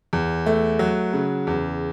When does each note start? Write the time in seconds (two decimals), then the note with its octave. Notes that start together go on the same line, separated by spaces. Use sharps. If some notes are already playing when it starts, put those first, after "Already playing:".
0.13 E2
0.46 A3
0.79 F#3
1.13 C#3
1.47 E2